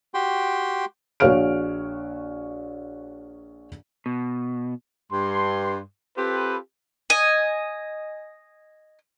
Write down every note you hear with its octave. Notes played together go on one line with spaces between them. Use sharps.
F#4 G4 G5 C6
A#1 F#4 C#5 F5 F6 D7
B2
G2 C6
C4 F4 G4 A4 B4
D#5 G#5